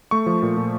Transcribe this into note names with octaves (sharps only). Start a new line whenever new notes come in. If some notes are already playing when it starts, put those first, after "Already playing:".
A3 C#6
F3
A#2
A#2